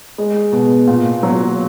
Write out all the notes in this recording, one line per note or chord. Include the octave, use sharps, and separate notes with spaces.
G#3
B2
A#2
F#3